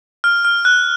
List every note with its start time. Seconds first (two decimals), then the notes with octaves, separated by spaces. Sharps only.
0.24 F6
0.45 F6
0.65 F#6